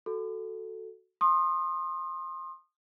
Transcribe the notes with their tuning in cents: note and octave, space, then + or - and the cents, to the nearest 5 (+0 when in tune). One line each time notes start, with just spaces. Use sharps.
F#4 +0 A4 +0
C6 +25 D#6 -20